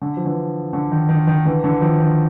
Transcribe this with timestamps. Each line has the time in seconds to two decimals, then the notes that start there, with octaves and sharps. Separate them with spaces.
0.02 D3
0.17 F3
0.25 D3 E3
0.73 D3
0.92 D#3
1.09 D#3
1.27 D#3
1.45 D3 E3
1.64 D3 E3
1.81 D#3 F3
1.99 D#3